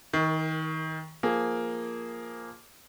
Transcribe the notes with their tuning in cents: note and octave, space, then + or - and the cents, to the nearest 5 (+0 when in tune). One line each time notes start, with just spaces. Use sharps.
D#3 +30 A#4 +0
F3 +0 A#3 +0 G#4 +0